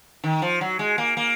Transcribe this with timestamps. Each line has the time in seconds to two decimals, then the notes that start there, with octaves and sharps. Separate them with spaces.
0.24 D#3
0.42 F3
0.61 F#3
0.79 G#3
0.98 A#3
1.17 A#3